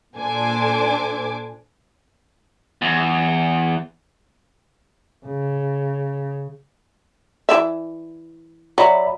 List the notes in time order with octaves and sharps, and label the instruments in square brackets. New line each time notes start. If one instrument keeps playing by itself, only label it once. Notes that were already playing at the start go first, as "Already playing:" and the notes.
[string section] A#2 D4 A4 C5 G#5 D6
[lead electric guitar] E2
[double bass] C#3
[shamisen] E3 D5 E5
[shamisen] F#3 [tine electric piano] D5 E5 B5